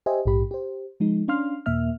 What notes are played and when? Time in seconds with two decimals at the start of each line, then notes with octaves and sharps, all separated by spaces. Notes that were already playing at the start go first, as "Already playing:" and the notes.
0.06 G4 C5 D#5 E5 G#5
0.26 A#1 G#2 G4 B5
0.51 G4 C5
1.00 F3 G#3 D#4
1.28 C#4 D4 F5 C6 F6
1.66 D#2 A#2 A#3 E5 F6